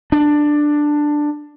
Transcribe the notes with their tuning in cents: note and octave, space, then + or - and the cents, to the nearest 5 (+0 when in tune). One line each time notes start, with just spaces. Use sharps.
D4 +10